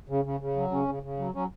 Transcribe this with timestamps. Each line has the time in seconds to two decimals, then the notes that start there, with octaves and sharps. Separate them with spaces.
0.09 C#3
0.25 C#3
0.40 C#3
0.56 F#3
0.72 C#3 C#4
0.88 C#3
1.03 C#3
1.18 F#3
1.34 F#3 C#4